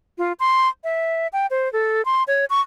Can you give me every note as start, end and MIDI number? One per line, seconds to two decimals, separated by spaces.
0.18 0.33 65
0.40 0.68 84
0.84 1.27 76
1.33 1.47 79
1.50 1.71 72
1.73 2.04 69
2.05 2.23 84
2.28 2.45 73
2.50 2.61 85